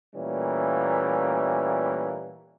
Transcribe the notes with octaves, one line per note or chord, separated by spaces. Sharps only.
A#2 E3 G3 A3 A#3 C#4